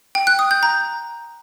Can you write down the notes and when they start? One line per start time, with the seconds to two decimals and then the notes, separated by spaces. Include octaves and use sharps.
0.15 G5
0.27 F#6
0.39 D#6
0.51 G6
0.63 A#5